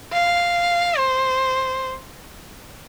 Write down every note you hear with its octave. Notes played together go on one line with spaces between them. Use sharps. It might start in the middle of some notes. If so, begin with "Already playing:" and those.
F5
C5